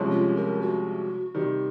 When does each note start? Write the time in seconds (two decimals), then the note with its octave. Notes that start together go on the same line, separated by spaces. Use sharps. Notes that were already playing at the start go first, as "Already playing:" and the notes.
Already playing: C2 C3 F3 G#3 C#4
0.11 F4
0.36 A#4
0.61 F#4
1.35 C3 D#3 G3